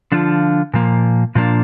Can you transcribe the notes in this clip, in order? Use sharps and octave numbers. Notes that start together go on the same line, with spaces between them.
D3 F3 D4 F4
A#2 F3 A#3
A#2 F3 A#3 D4